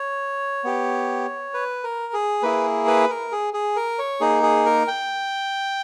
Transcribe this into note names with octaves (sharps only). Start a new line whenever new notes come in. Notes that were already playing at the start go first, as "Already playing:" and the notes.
Already playing: C#5
B3 G4
B4
A#4
G#4
A#3 E4 G#4 B4
B4
A#4
G#4
G#4
A#4
C#5
A#3 D#4 G#4
G#4
A#4
G5